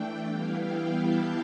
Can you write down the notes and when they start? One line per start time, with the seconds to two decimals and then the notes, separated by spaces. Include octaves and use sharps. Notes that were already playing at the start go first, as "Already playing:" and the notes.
Already playing: E3 A3 D4 G5
0.24 E3 G3 B3 E4 F5
0.61 G5
0.97 A5